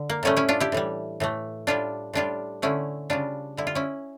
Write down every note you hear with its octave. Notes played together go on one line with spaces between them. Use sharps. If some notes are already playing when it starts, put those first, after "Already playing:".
Already playing: D3
A#3
A2 G3 A3 C#4
C#4 E4
D4 F4
E4 G4
A2 E3 G3
A2 E3 A3
A2 G3 D4 F4
A2 G3 D4 F4
D3 A3 C#4 E4
C#3 G3 D4 F4
D3 G3 E4
F4
C#4 E4